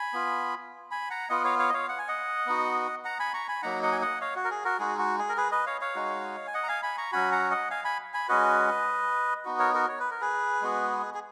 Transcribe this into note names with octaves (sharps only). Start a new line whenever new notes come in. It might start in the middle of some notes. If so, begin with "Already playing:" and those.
Already playing: G#5 B5
B3 F4
G#5 B5
F#5 A#5
B3 F4 D#5 F#5
C#5 F5
C#5 F5
D#5
C#5 F5
F#5
G#5
D#5 F#5
B3 D#4 F#4
F#5 A#5
G#5 B5
A#5 C#6
G#5 B5
F#3 A#3 D#4 F#5 A#5
D#5 F#5
G#5
D#5 F#5
C#5 F5
F#4
A#4
G#4
F#4 A#4
G#3 D#4 F#4 G#4
F#4
G#4
A#4
G#4 B4
B4 D#5
C#5 F5
C#5 F5
G#3 D#4 F#4
G#5
D#5 F#5
A#5
F5 G#5
G#5 B5
A#5 C#6
F#3 C#4 F#4 G#5 B5
F#5 A#5
D#5 F#5
F5 G#5
G#5 B5
G#5 B5
G#3 C#4 F#4 B4 D#5
B3 D#4 F#4
A#4 C#5
F#4 A#4
C#5
B4
A#4
G#4 B4
G#3 B3 F#4
G#4